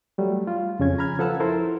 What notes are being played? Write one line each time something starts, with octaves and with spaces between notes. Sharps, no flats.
F#3 G3 A3
F4
F2 C#3 C#4 G#6
A#5 B5 F6 G#6
F3 A4 B4 F#5 A5 E6
E4 A4 A#4 C5